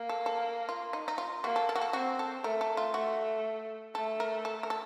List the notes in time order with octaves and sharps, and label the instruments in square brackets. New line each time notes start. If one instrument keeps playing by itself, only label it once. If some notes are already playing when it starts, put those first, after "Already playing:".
Already playing: [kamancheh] A#3
[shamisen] A4
A4
F4
D#4
D#4
F4
[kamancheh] A#3 [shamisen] F#4
[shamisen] A4
A4
F#4
A4
[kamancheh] C4 [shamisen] F#4
[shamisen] A4
[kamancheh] A3 [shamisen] A#4
[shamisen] A4
F4
[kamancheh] A3 [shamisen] F#4
[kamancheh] A3 [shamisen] A4
[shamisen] A#4
A4
A#4
A4